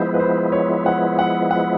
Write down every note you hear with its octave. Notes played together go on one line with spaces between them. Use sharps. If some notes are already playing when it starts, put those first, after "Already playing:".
Already playing: F3 G#3 B3 E4 C5
B4
C5
C#5
F#5
F#5
F#5